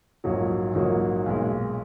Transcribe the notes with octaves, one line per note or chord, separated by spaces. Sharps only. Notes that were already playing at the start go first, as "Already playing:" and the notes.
A#1 G#2 F#3 A#3
A#1 G#2 F#3 A#3
B1 A#2 G#3